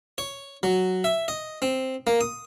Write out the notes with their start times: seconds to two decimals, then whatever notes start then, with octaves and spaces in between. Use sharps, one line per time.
0.18 C#5
0.63 F#3
1.04 E5
1.28 D#5
1.62 C4
2.07 A#3
2.21 D#6